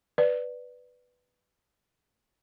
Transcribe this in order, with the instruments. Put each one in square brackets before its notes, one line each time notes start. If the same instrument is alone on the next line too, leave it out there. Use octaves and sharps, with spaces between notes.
[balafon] B4 D5